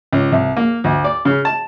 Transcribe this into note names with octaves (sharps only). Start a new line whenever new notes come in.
C#2
C2
A#3
D2
D5
C#3
A5